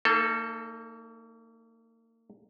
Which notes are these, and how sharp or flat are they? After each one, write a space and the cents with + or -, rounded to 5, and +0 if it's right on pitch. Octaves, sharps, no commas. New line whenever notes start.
A#3 -40 D#4 +0 A4 +0